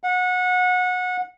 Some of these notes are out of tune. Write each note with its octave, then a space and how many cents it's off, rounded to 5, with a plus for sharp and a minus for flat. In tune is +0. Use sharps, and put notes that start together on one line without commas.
F#5 -25